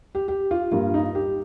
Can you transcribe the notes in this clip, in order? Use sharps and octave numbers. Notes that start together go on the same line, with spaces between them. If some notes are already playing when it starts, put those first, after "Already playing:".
G4
G4
F4
G2 G3 A#3 F4
D#4
G4